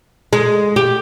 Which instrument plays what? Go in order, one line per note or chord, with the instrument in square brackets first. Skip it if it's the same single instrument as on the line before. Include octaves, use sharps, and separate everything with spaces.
[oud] G#3
G4